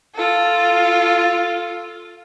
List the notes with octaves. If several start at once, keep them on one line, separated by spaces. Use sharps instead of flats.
F4 A4